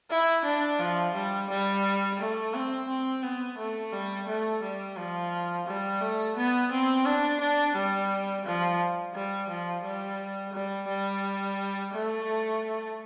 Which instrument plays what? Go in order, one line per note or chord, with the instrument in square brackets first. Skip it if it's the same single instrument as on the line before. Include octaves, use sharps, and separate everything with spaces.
[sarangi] E4
D4
F3
G3
G3
A3
C4
C4
B3
A3
G3
A3
G3
F3
G3
A3
B3
C4
D4
D4
G3
F3
G3
F3
G3
G3
G3
A3